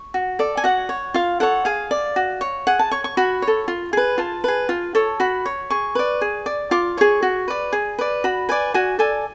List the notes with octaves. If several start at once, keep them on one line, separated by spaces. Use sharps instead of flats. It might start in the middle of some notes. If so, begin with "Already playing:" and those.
Already playing: C#6
F#4
A4 D5
G#5
F#4 F#5
C#5
F4 F5
A4 C#5 F#5
G#4 F5
D5
F#4
C#5
G#4 F#5
A5
C#5 C#6
C#6
F#4 B5
C#5
A4
F4
G#4 B4
F4 A5
G#4 B4
F4
A4 C#5
F#4 B5
C#5
G#4 C#6
B4 D5
G#4
D5
F4 D6
G#4 C#5 C#6
F#4
B4 D5
G#4
B4 D5
F#4 B5
B4 D5 G#5
F#4 G#5
A4 D5 G#5